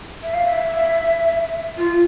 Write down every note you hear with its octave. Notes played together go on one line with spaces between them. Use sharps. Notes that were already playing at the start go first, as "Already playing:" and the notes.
E5
F5
E5
F4